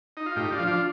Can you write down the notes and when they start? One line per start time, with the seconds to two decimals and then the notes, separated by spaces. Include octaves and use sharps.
0.17 D#4
0.26 F4
0.36 A2 D#4 G4
0.52 D4 F4
0.59 F3
0.67 D4 F4